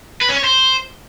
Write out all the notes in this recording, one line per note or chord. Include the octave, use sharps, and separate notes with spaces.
B4
C#4
C#5
C5